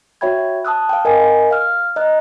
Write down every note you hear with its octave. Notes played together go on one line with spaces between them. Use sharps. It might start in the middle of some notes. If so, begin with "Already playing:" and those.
F#4 C#5 E5 G5 B5 G#6
A5 D#6 E6 F#6
F5 G5
A#4 D#5 G#5
F5 F6
D#5 A#5 F#6